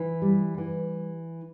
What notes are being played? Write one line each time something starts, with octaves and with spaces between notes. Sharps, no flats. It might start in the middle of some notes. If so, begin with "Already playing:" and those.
Already playing: E3
G3
E3